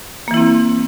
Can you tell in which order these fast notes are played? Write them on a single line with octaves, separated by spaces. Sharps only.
A#3 E3 E4 C4